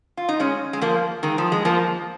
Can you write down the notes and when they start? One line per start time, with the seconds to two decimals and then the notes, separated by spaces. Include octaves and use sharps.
0.17 F4
0.29 D#4
0.40 G#3 C#4
0.73 G#3
0.81 F3 A#3
1.23 D#3 G#3
1.38 F3
1.52 G#3
1.65 F3 A#3